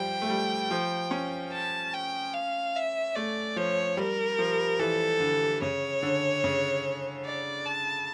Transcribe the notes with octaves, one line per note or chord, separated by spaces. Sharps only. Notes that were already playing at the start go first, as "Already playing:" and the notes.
Already playing: F3 G3 G5
A3
G3
F3
C#4
A5
G5
F5
E5
A3 D5
F3 C#5
G3 A#4
F3
E3 A4
D3
C#3 C#5
D3
C#3
D5
A5